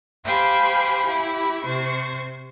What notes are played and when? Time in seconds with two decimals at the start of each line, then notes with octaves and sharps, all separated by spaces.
0.24 G4 C5 F5 G5 G#5 B5
1.06 E4 G4 B5
1.61 C3 C5 C#6